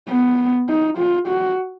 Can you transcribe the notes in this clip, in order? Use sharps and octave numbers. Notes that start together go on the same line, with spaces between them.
B3
D#4
F4
F#4